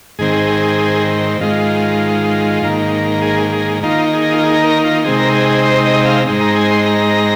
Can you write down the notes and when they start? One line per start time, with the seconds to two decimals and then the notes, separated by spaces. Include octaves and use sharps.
0.19 G#2 D#3 C4 G#4
1.41 G#2 D#3 G#3 F4
2.62 G#2 D#3 A#3
3.22 G#4
3.52 G#4
3.83 D#3 A#3 D#4 F4
4.13 G#4
4.32 F4
4.43 G#4
4.64 A#4
4.84 F4
5.04 C3 G#3 C4 D#4 G#4
5.19 A#4
5.35 G#4
5.49 G#4
5.65 C5
5.85 D#5
6.05 F5
6.26 G#2 G#3 C4 D#4
6.41 A#5
6.56 G#5
6.71 C6
6.86 A#5